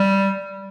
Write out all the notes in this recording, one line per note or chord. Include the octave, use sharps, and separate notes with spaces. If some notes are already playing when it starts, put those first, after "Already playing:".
Already playing: G3